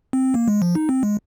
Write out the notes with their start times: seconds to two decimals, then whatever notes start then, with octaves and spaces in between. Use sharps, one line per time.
0.13 C4
0.34 A#3
0.48 G#3
0.62 F3
0.75 D#4
0.89 C4
1.03 G#3